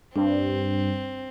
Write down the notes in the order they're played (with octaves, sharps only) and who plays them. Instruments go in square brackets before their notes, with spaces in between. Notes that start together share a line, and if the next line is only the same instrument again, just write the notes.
[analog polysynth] G2 [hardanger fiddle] C4 [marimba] D4